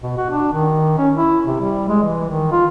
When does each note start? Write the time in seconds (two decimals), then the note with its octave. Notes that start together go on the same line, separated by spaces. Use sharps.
0.03 B2
0.17 F#4
0.30 D4
0.53 D#3
0.98 C#4
1.16 E4
1.45 C3
1.61 G3
1.89 G#3
2.03 E3
2.29 D#3
2.52 F4